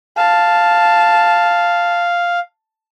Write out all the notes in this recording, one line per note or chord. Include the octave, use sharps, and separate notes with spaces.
F5 A5